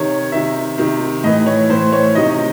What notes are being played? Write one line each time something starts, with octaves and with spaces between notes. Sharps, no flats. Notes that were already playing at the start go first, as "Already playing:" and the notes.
Already playing: C3 D#3 C#5
C3 D#3 E5
C3 D#3
A2 E3 D#5
C#5
A2 E3 C5
C#5
C3 D#3 D#5